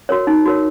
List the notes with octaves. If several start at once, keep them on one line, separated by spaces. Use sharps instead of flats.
F#4 A#4 C#5
D#4
F#4 A#4 C#5